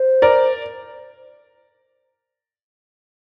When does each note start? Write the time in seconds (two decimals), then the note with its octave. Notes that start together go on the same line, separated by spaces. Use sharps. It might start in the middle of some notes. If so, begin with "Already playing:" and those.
Already playing: C5
0.22 A#4 D5